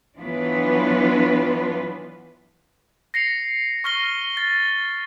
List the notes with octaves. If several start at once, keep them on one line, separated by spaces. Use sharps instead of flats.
E3 F#3 B3 D4 F4 B4
A#6 C7 C#7 F7
C#6 F6 A#6 G7
A6